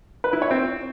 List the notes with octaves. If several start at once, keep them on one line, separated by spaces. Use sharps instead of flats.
B4
E4
C#5
C4